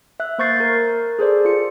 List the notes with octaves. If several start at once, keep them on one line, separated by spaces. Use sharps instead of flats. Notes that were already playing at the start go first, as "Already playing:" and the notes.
E5 F#6
A#3 C5 C#6 G6 A6 C7
A#4
G#4 A4 C5 D5
F4 C#7